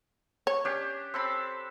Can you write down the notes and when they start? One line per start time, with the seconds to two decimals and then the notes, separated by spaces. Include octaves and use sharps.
0.47 C#5
0.65 C#4 D4 G4
1.14 C4 A4 B5